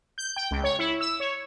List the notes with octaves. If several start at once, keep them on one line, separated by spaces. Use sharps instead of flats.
G6
G5
C#2
C#5
E4
E6
C#5